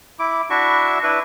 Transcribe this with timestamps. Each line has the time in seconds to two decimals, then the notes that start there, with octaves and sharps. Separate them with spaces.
0.19 E4 D6
0.50 D4 E4 F#4 E5 C#6
1.03 D4 E4 B4